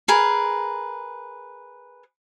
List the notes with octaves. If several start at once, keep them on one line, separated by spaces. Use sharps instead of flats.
G#4 A#4 B4